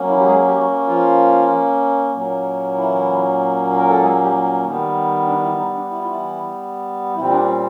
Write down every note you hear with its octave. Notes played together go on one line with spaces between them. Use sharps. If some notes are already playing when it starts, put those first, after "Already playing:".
Already playing: F#3 A#3 C#4
E3 E4
G4
G#3 G#4
G4
F#3 F#4
F3 F4
A#2 F#3 A#3 C#4
E3 E4
A#4
A4
G#3 G#4
G3 G4
D#3 G3 B3
D4
E3 E4
D#3 D#4
D4
E4
F4
E3 E4
A#2 E3 G3 C4 E4
D4
C#4